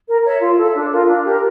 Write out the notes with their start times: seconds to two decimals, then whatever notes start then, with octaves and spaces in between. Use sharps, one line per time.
0.08 A#4
0.25 C#5 E5
0.41 F4
0.58 A4 E5
0.75 D4
0.92 F4 A#4
1.09 D4
1.26 G4 A#4